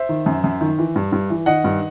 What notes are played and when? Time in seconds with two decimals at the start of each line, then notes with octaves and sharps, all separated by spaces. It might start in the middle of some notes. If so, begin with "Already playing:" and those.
Already playing: C5 E5
0.09 D#3
0.26 F#2
0.44 F#2
0.61 D#3
0.79 E3
0.96 G2
1.12 G2
1.30 E3
1.46 D#3 D#5 F#5
1.64 G2